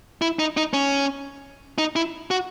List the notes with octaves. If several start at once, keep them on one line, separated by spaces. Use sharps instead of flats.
E4
D#4
D#4
C#4
D#4
E4
F#4